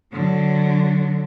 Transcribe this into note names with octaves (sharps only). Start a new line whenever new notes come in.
D3 F#3